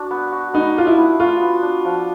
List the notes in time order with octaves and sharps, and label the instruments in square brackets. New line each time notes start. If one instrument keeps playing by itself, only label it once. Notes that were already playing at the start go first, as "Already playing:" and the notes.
Already playing: [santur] D4 F#4
B3
F#4
[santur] B3 [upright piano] D#4
[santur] D4 [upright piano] F4
[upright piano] E4
[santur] B3
[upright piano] F4 [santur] F#4
[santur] B3
D4
F3